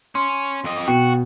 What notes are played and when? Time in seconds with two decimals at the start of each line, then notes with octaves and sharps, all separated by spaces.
0.15 C#4 C6
0.64 F2 D#5
0.88 B2 F#4 G5